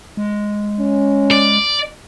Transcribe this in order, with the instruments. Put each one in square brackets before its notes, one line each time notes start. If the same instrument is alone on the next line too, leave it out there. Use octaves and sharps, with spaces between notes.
[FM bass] G#3
[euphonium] C#4
[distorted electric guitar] D5